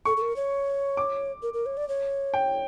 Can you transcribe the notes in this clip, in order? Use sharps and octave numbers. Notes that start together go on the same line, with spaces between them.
A4 C#6
A4
A#4
C#5
D6
A#4
A#4
C#5
D5
C#5
G5